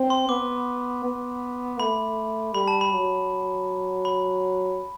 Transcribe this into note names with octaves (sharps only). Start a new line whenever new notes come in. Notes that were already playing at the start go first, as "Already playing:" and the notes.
Already playing: C4
C6
B3 D6
B3
A3 B5
G3 B5
A5
B5
F#3
B5